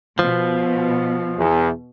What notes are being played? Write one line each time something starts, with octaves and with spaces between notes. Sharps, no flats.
B2 F3
E2